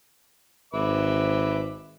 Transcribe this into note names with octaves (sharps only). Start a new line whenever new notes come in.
G#1 B4 E5 D6